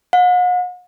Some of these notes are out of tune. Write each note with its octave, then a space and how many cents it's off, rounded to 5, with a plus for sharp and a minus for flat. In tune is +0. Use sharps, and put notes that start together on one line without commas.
F#5 -45